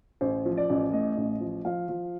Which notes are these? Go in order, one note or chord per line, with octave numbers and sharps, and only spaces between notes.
A1 C5
F3
D5
A1
A2 D#5
A1
F3
F3 F5
F3